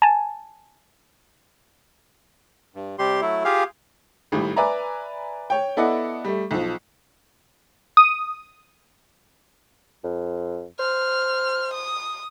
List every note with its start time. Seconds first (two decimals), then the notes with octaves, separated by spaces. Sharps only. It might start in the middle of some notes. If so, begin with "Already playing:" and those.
0.02 G#5 A5
2.75 G2
2.99 C3 G3 G4 C6
3.21 F#3 A3 E4
3.45 F4 G4 G#4 F5
4.32 G#1 A2 G3
4.56 B4 D5 E5 G#5 A#5
5.50 C#5 G5
5.77 B3 E4 A4 D5 D#5 F#5
6.24 G3 A3
6.51 B1 F3
7.97 D#6
10.04 F2
10.80 C5 F6
11.74 D#6